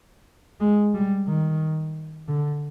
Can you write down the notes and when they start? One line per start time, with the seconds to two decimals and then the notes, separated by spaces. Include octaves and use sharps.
0.60 G#3
0.95 G3
1.27 D#3
2.28 D3